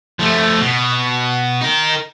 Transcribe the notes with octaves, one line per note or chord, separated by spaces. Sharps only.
F3 A3
B2
D#4 A#4